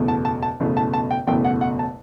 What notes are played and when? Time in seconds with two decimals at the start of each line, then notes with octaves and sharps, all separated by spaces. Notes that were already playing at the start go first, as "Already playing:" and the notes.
Already playing: F#1 E2 B2 A3
0.08 A5
0.25 A5
0.43 A5
0.60 F#1 E2 B2 A3
0.77 A5
0.94 A5
1.11 G5
1.27 F#1 E2 B2 A3 G5
1.45 F#5
1.61 F#5
1.79 A5